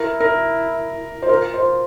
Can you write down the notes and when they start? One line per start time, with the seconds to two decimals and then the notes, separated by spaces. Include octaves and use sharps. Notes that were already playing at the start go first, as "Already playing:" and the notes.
Already playing: E4 A#4
0.20 A#4
1.22 C5
1.29 F4 A#4
1.54 C5